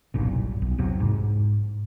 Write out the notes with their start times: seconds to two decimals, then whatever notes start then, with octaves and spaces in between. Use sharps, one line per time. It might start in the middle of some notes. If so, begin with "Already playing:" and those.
0.14 F#1 B1 G2 A#2
0.62 B1
0.78 E2 C3 F#3
1.00 G#2